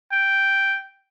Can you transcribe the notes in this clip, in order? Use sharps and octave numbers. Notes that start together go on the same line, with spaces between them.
G5